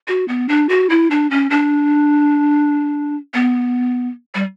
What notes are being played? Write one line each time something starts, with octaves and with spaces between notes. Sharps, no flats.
F#4
B3
D4
F#4
E4
D4
C#4
D4
B3
G3